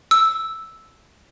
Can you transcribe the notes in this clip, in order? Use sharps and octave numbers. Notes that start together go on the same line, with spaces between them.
E6